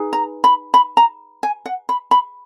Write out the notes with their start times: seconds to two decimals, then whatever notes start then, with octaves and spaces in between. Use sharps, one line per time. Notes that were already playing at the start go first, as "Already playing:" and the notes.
Already playing: D#4 G#4 B4
0.13 A#5
0.44 B5
0.74 B5
0.97 A#5
1.43 G#5
1.66 F#5
1.89 B5
2.11 B5